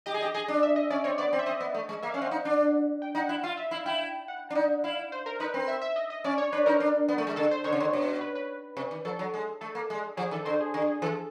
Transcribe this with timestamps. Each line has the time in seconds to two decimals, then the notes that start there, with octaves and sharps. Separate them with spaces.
0.06 G4 D#5
0.14 G#4
0.21 G4 D#5
0.34 G#4 D#5
0.48 D4
0.63 E5
0.76 D#5
0.90 C#4 D5
1.04 C4 C#5
1.18 B3 D5
1.33 C4
1.39 E5
1.46 C4 D#5
1.60 B3
1.74 A3
1.89 G#3
2.03 A#3 E5
2.11 F5
2.14 C#4
2.18 C4 F#5
2.31 D#4
2.45 D4
3.02 G5
3.15 D#4 F#5
3.29 E4
3.43 F4 F5
3.57 E5
3.71 E4 F5
3.86 E4 G5
4.28 F#5
4.51 D4
4.55 D#4
4.84 E4 F5
5.12 C5
5.26 A#4
5.40 D#4 B4
5.54 C4
5.68 E5
5.82 E5
5.96 D#5
6.10 D#5
6.24 C#4 D5
6.38 C#5
6.52 D4 B4
6.66 D#4 A#4
6.80 D4
7.08 B3
7.18 A3
7.27 G#3
7.36 D3 A4
7.51 C5
7.64 D3 C#5
7.73 C#3
7.80 D3
7.93 B2
8.21 B4
8.35 B4
8.77 C3
8.91 D#3
9.05 F3 A4
9.19 F#3
9.34 G#3
9.61 A3 A4
9.75 A#3
9.90 G#3
10.17 F3 G#4
10.31 D#3 A4
10.45 D3 C5
10.60 G#4
10.74 D3 G#4
10.87 G#4
11.02 E3 A4